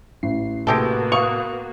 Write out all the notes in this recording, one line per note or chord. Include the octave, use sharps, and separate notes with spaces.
A1 C7
A2 C3 G#3 A#3 B3 F#4 G4 A4
F5 C#6 D#6 F7